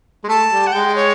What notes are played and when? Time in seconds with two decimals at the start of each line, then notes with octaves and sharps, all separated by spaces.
0.24 G#3
0.28 A3 A5
0.51 G3
0.67 F#5
0.73 G#3 G5
0.95 C#5